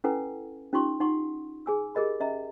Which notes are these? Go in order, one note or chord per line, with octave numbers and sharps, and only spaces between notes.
C#4 E4 A4 B4 F#5 G#5
C#4 D#4 F4 G4 C6 C#6
D#4 F#5 C6 C#6
G#4 G#5 E6
G4 G#4 A#4 D#5 B5
C#4 D#5 E5 A#5